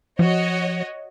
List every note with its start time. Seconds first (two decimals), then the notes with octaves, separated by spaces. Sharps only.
0.19 F3 F#4 C#5 D#5